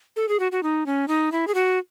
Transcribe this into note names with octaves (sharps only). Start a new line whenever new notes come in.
A4
G#4
F#4
F#4
D#4
C#4
D#4
E4
G#4
F#4